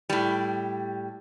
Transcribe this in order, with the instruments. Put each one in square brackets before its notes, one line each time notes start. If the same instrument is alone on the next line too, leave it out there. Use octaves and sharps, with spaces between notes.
[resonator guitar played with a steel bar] A2 G3